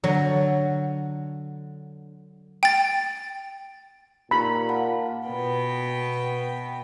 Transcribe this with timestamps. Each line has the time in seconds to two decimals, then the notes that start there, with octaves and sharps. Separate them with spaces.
0.04 D3 F#3
2.63 G5 A6
4.31 A#2 D#4 G4 A#5 B5
4.69 F5 F#5 A5
5.27 B2 B3 G5